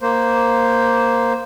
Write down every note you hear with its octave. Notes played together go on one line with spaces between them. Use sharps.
A#3 C5